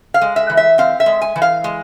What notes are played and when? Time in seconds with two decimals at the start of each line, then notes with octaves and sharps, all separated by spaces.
0.14 F5
0.21 G#3
0.36 E5
0.50 E3
0.57 E5
0.78 C4 F5
1.00 E5
1.06 G#3
1.22 G#5
1.36 E3
1.42 F5
1.64 G#3